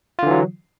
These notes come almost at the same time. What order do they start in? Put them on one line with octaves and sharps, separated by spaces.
F4 D3 E3 F#3